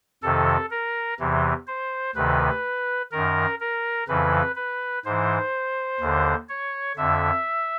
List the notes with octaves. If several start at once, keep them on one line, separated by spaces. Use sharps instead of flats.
F2 C3 D#3 A4
A#4
E2 C3 E3
C5
D2 C3 D#3 B4
F#2 D#3 A#4
A#4
F2 C#3 E3 B4
B4
G#2 E3 C5
D#2 D3
C#5
F2 D3 E5